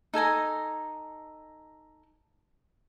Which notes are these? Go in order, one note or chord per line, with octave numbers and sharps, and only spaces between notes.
D#4 A4 G#5 A#5